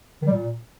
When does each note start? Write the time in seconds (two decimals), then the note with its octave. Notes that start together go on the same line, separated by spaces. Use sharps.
0.22 D#3
0.27 G3
0.32 A#2